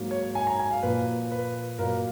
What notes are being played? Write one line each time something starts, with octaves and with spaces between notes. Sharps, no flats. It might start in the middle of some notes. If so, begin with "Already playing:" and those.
Already playing: G#2 F#3 A#3
C#5
G#5
A#5
G#5
F5
A#2 F3 A#3 B4
B4
A#2 F#3 A#3 A#4